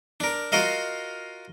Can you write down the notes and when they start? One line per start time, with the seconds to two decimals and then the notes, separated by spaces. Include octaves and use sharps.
0.20 D4 A#4
0.52 F4 F#4 A#4 D#5 F5